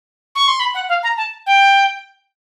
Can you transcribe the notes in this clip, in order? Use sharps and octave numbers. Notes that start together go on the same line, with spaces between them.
C#6
C6
B5
F#5
F5
A#5
A5
G5